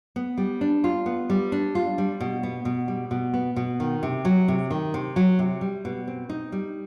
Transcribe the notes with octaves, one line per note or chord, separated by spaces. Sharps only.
B3
G3
D4
F4
B3
G3
D4
F4
G3
B2
B3
B2
G3
B2
B3
B2
D#3
C3
F#3
C3
D#3
C3
F#3
C3
G3
B2
C4
D#4
G3